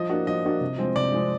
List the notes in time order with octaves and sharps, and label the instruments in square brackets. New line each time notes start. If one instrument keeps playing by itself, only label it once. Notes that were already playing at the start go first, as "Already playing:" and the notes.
Already playing: [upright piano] F3 [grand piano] D#5
[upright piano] A#3 D4 F#4
[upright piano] F3 [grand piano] D#5
[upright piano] A#3 D4 F#4
C3
F3 G#3 C4
[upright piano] C3 [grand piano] D5
[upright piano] F3 G#3 C4